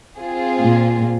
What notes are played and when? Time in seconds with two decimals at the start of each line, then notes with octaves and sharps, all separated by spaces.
0.19 C4 F4 G#4
0.60 A#2